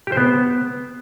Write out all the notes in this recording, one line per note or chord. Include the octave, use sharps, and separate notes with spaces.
G4
C5
B3